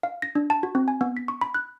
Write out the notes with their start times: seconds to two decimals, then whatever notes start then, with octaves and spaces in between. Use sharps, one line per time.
0.03 F5
0.22 A#6
0.35 D4
0.50 A5
0.63 F#4
0.75 C4
0.88 G#5
1.01 B3
1.17 B6
1.28 C#6
1.41 B5
1.54 F#6